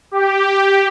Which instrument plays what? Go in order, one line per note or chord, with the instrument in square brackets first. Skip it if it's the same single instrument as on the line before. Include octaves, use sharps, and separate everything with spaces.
[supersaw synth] G4